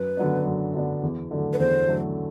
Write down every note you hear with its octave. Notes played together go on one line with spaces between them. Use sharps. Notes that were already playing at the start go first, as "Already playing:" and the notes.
Already playing: F#2 B4
D3 F#3 B3 D4
F#2
D3 F#3 B3 D4
E2
D3 F#3 A3
B4
E2 C5
D3 F#3 A3